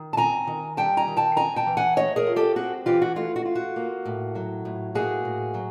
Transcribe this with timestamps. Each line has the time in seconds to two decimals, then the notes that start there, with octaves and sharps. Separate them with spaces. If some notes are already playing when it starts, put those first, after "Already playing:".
Already playing: D#3
0.13 A5
0.17 C4 G#5 A#5
0.47 D#3
0.77 G3 G5 A5
0.97 G#5 A#5
1.08 D#3
1.17 G5 A5
1.36 C4 G#5 A#5
1.56 G5 A5
1.67 E3
1.77 F#5 G#5
1.97 A3 C#5 D#5
2.16 G#4 A#4
2.26 F4
2.36 G4 A4
2.56 C4 F#4 G#4
2.86 E3 F4 G4
3.02 F#4
3.16 A3 F4
3.36 F#4
3.45 F4
3.55 F#4
3.76 A#3
4.05 A2
4.35 F#3
4.65 A2
4.95 A#3 F#4 G#4
5.25 A2
5.54 F#3